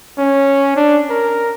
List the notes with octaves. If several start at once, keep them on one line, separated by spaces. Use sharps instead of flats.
C#4
D4
A#4